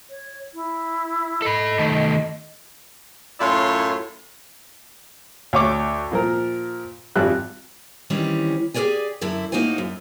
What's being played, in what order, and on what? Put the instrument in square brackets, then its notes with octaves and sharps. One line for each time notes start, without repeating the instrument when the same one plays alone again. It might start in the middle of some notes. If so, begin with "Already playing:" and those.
[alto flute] C#5
E4
[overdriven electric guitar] A4 B5 [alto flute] D#5
[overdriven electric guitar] D#3 A3
[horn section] F#2 A2 E4 F4 C#5 C6
[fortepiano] D2 C#5 D6
A#2 F3 A#4
G#1 F2 G3 F#6
[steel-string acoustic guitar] D#3 E3 G3 C4 C#4
G4 G#4 A#4 C#5 D5 G#5
F#2 D3 E4 A#4
A2 A#3 D#4 F#4 C5 G#5
F#2